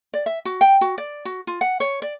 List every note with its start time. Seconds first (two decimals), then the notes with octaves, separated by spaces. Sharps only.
0.14 D5
0.26 E5
0.45 F#4
0.61 G5
0.81 F#4
0.98 D5
1.25 F#4
1.47 F4
1.61 F#5
1.80 C#5
2.02 D5